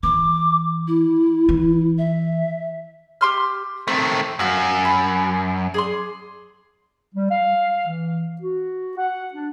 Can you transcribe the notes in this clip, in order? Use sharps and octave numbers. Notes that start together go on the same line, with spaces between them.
E3 D6
E4
E3
E5
G4 C6 F6
D#3 A3 C4
F#2 F#4 F5
B5
G#4 D5 C6
G3
F5
E3
F#4
F#5
D4